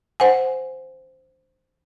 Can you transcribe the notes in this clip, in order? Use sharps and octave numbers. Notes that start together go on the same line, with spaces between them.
C5 F#5 G#5